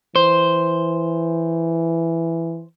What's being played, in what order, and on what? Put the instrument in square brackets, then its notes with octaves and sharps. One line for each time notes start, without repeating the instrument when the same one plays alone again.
[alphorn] E3 [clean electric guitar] C5